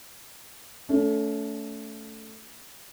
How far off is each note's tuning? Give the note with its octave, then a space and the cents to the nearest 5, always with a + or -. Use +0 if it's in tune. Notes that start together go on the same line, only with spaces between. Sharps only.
A3 +0 C#4 +35